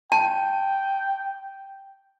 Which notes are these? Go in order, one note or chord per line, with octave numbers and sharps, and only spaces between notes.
G5 A5